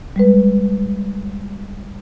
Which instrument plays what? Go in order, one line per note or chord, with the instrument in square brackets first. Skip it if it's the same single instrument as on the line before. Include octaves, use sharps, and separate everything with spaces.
[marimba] G3 G#3 B4